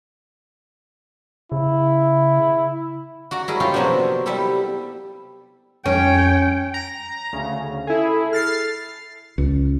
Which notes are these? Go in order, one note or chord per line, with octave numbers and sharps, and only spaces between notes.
C#3 E4
F#4 D5 A#5
E4 G#4 A#4
D#4 F4 G4 A4 C#5 G5
C3 F3 F#3 A#3 B3 D4
G3 E4 G4 A4
F2 G3 C#4 C#5 G5
A#5
D2 C#3
E4 G#4 A4
F6 A6 C7
C#2